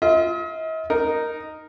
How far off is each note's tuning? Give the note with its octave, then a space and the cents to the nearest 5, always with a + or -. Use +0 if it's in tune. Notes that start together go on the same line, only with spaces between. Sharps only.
F4 -15 D#5 +45
D#4 +0 A#4 +0